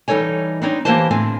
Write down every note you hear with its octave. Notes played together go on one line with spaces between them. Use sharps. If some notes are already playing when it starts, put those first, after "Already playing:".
E3 G3 D#4 A4 C#5 G#5
B3 C4 D4 D#4 C#5
E3 A#3 G4 B4 C5 A5
A2 D3 C4 G#5